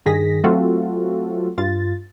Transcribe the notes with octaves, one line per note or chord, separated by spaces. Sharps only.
G2 D#3 G#4 A#6 B6
F#3 A3 C4 F4 F#4 A4
G2 F4 A6